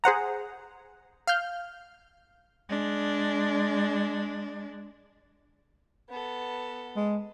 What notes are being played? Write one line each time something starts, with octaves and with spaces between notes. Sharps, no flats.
G#4 C5 F#5 A#5
F5 F6 G6
G#3 D4
B3 A4
G#3